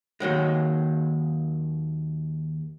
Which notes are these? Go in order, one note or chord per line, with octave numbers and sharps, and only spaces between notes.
D#2 D#3 F#3 G#3